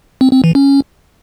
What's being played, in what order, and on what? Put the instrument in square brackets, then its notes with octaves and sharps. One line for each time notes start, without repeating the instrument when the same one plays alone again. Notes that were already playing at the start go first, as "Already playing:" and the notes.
[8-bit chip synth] C4
C4
E3
C#4